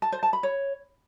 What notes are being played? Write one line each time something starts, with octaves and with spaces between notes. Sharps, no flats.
A5
C5
A5
B5
C#5